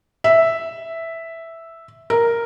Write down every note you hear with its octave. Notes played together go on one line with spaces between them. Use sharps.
E5
A#4